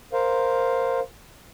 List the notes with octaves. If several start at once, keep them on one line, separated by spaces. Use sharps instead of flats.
A#4 C5 F5